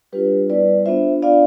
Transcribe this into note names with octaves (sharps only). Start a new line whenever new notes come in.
G3 D4 F4 G4 B4
G3 B3 E4 B4 D5
B3 D4 F4 C5 E5
B3 D4 F4 D5 F5